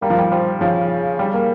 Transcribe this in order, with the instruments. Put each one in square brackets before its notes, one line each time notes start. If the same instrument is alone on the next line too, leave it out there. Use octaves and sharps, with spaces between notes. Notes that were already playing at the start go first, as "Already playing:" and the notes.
[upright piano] G3 [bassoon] A#3
[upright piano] F3
G3
[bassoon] F3 [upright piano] G3
[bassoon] C#3 [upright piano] F3
[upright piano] G3
A#3